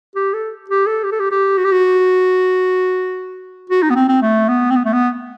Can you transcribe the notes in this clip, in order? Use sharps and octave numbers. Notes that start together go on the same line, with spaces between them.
G4
A4
G4
A4
G4
A4
G4
G4
F#4
G4
F#4
F#4
D#4
B3
C4
C4
A3
B3
C4
B3
A3
B3